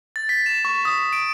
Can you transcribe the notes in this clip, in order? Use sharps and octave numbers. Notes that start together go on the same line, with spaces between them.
A6
B6
E7
C#6
D#6
D#6
D7